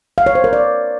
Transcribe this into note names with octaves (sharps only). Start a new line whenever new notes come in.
F5
C#5
C5
A#4
D5